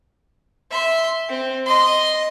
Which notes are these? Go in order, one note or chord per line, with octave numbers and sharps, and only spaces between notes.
E5 C6
C4
D#5 C6